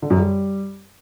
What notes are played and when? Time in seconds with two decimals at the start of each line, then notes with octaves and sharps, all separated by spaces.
0.02 D3
0.10 F#2
0.18 G3